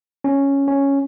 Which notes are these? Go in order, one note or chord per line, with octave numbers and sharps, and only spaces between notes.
C#4
C#4